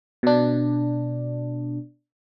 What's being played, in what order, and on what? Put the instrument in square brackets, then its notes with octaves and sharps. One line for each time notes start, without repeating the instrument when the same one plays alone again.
[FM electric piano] B2 D4